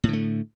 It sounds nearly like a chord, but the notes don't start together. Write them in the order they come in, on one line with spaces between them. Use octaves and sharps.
A2 D3 A3